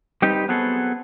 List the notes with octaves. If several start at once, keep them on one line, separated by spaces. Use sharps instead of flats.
G3 C4 D#4 G4 B4
F#3 B3 C4 G#4 A4